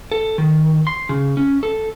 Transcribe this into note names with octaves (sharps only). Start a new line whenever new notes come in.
A4
D#3
C6
C#3
C#4
A4